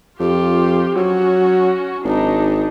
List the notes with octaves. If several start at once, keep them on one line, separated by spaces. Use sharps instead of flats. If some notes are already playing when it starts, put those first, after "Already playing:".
F2 F4 G4
F#3 C#4 F#4
G#1 D4 D#4